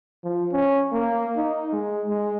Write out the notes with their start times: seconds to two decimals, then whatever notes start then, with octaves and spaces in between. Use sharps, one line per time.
0.24 F3
0.53 C#4
0.92 A#3
1.36 D#4
1.73 G#3
2.07 G#3